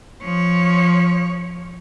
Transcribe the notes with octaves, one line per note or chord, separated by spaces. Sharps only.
F3 C#5